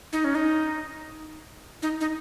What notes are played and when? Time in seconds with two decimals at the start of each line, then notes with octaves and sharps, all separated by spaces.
0.13 D#4
0.24 C#4
0.35 D#4
1.82 D#4
2.01 D#4